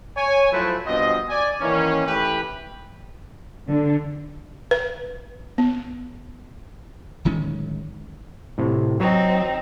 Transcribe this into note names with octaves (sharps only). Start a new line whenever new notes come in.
C#5 G#5
F3 F#3 A3 E4 B4 C5
G2 B2 F3 C4 D#5
D5 G#5
D#3 E3 A#3 C#4
E3 A3 G4 B4
D3
B4
B3
D1 D#3 G#3 C#4
A2 C3
F#3 C4 D#4